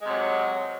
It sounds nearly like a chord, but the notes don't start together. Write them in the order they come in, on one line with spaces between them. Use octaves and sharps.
G#3 C3 F#3